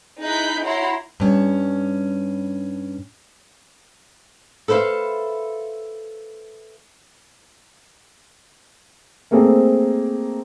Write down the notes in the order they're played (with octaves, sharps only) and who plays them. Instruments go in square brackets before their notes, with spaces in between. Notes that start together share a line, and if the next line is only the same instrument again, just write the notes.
[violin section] D#4 E4 G#4 F#6 G6 B6
E4 F#4 C#5 F#5 A#5 C6
[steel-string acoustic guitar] G2 C#4
[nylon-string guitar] A4 B4 C5 E5 F5
[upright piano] A3 A#3 C4 G#4 A4 C5